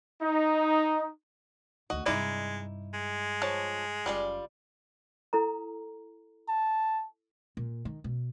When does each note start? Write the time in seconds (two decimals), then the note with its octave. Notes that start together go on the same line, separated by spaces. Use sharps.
0.22 D#4
1.90 D2 D#3 F#4 D#5
2.06 G2 C3 G#3 D#4 E4 D5
2.94 G#3
3.42 F3 C#5 A5
4.06 F#1 G3 F4 D5
5.33 E4 A4 A#5
6.49 A5
7.57 A#2
7.85 D#3
8.04 B2